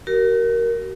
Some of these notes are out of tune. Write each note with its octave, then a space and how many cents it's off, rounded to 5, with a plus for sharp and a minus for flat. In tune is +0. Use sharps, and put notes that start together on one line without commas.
F#4 +45 A#4 +0